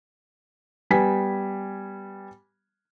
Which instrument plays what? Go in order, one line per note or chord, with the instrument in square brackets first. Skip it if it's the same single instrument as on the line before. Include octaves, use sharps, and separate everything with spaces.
[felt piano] G3 B3 G#5 B6